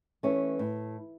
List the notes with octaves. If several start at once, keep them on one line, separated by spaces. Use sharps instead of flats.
E3 A3 C#4
A2